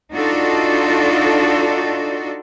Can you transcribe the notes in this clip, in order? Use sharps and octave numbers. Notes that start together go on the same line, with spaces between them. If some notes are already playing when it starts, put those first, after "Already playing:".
D4 D#4 F4 F#4 A4 D5